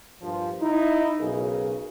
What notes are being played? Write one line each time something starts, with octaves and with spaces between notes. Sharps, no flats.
G2 A#2 F3
D#4 E4
B1 C#3 G#4 A#4